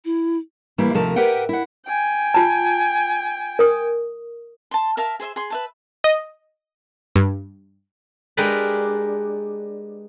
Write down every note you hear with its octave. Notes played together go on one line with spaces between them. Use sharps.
E4
E3 G3 A3 A#3 E4
D#2 C3 F3 A3 A#4 A5
G4 A#4 B4 E5 F#5 G5
E4 F#5
G5 G#5
F4 A5
A#4 D#6
A5 C6
A#4 E5 F5 A5
G#4 C5 E5 C6
G#4 C6
B4 E5 A5
D#5
G2
G#3 D4 G4 A#4 B4 B5